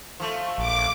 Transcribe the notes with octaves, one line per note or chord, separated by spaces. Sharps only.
F3 A3
A#1 D6